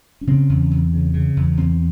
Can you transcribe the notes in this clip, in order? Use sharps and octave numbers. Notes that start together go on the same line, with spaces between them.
C#4
C#3 C4
E2
E2
C#3
C#3
E2
E2 C4